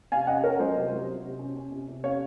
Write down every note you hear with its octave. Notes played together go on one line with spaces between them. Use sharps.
C3 F5 G#5
C#4 D#5 F#5
C#4 A#4 C#5
F#3 C5 D#5
C3
F#3
C3
C3
C#4
C#4
C3
C3
C#4 C#5 F5